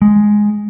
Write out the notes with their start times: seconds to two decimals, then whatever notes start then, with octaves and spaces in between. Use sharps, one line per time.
0.02 G#3